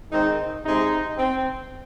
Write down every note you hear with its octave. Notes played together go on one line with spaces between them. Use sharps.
D#3 G#3 C4 D#4
C3 G#3 C4 D#4
C4